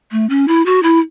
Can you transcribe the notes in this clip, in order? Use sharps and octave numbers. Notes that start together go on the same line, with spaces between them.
A3
C#4
E4
F#4
E4